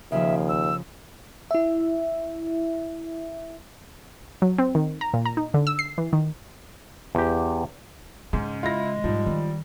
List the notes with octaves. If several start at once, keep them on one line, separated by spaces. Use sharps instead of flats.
D#2 C#3 F3 E5
E6
E4 E5
F#3
C4
D#3
A#5
A#2
A#5
D#4
D3
E6
C7
E3
D#3
E2 G4
G#2 C#3 G#3 C#4
G#3 E4 F4 A#6
G#2 F3 G3 D#4
D#3